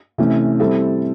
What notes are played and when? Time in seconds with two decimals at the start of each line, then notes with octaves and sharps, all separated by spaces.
0.18 C3 E3 A3 C#4
0.59 G3 C4 E4 A4